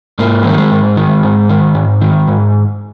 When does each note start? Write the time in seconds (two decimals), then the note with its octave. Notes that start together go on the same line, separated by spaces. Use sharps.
0.19 G#2 A#3
0.43 D#3 F3
0.51 G3
0.57 G#3
0.71 G#2
0.97 D#3
1.23 G#2
1.49 D#3
1.75 G#2
2.01 D#3
2.28 G#2